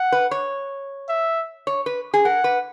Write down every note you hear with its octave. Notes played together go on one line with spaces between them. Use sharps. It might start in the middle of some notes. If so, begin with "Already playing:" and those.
Already playing: F#5
B4
C#5
E5
C#5
B4
G#4
A#4 F#5
B4